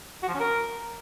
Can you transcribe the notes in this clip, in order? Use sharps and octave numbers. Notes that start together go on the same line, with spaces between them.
F#4
F3
C#4
A#4